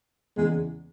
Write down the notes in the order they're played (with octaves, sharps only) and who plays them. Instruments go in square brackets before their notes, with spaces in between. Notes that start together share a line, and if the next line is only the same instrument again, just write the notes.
[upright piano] E2 C#3 E3 [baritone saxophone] G#3